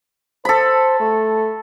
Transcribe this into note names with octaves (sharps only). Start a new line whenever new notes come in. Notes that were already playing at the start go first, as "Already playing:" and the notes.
A4 C5 B5
A3